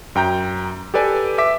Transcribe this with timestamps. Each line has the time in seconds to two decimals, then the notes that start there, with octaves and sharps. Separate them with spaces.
0.15 F#2 G5 A#5 G6
0.94 G4 A4 B4 D5 G#5
1.38 E5 D6 B6